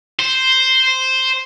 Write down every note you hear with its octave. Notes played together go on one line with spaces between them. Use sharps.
C5